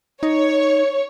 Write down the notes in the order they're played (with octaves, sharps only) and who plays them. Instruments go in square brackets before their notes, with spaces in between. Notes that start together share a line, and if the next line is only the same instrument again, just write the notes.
[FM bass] D#4 [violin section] C#5